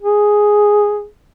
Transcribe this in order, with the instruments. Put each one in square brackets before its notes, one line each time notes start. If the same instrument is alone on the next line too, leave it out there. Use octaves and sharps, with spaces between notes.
[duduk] G#4